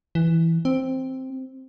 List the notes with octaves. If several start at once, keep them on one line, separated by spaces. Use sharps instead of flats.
E3
C4